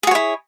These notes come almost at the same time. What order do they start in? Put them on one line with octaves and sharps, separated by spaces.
G#4 F#4 C#5 E4